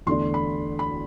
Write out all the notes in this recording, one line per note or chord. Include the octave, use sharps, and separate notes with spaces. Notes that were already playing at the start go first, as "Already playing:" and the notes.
E2 D3 A3 D4 C6
B5
B5